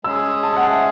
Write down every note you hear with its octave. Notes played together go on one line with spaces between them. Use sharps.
G#3 C#4 G#4 E6
A5
F#5
E5